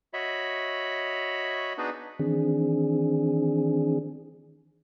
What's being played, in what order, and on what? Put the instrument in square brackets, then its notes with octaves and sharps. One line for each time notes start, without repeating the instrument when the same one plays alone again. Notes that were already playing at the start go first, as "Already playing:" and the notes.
[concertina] F#4 C#5 D#5 E5 B5
B3 D4 D#4 F#4 G#4 B4
[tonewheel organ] D#3 E3 C4 D4 G#4